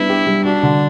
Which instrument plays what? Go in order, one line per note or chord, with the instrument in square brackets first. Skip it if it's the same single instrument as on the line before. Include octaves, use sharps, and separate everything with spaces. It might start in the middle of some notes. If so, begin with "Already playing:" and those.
Already playing: [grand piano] G3 B3 D4 [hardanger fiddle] E4
[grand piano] G4
G3
[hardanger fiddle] D4 [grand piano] F#4
[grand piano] D3